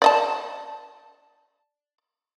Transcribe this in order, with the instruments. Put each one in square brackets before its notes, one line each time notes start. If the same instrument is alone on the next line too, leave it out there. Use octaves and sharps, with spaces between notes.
[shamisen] D5 D#5 A5